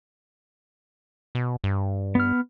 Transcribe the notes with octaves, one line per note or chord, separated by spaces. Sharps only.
B2
G2
B3 F6